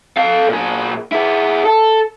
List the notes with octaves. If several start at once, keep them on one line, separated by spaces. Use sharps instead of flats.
A4 F5
A#2 G#4
E4 G#4
A4